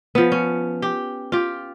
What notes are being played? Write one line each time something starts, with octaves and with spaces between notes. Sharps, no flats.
F3 B3
C#4
G4
F4 G4